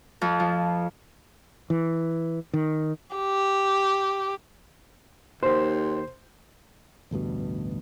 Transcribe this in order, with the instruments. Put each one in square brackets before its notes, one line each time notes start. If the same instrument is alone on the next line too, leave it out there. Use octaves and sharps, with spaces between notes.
[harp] F2
F3
[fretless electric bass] E3
D#3
[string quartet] G4
[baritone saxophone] D#2 [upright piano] C5
[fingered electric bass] A1 D2 G2 B2